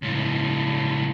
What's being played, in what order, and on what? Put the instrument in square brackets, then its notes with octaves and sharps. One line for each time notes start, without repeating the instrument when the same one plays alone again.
[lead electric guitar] C#2 A2